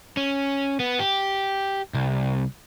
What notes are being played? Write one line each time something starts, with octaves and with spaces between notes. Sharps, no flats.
C#4
B3
G4
C2